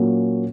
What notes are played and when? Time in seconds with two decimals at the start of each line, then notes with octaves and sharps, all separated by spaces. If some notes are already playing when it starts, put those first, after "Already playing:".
Already playing: A#2 F#3 A#3 C#4